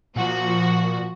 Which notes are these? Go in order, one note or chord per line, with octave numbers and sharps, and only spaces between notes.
A#2 F3 F#4